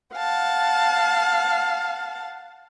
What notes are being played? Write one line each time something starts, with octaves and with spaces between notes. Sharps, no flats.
F5 F#5 A5